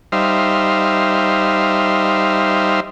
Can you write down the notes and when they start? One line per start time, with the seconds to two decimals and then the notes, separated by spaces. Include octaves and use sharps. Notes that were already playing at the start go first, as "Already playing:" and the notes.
0.12 G3 D#4 C5 E5 F5